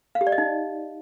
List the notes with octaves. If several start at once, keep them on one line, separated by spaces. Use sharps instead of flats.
F5
G4
D5
D#5
D#4